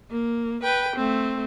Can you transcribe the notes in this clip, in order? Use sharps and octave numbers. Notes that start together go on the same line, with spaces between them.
A#3
B4 G5
A3 C4